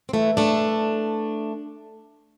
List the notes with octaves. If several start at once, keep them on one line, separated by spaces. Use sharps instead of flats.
C4
E3 A3
A3 D4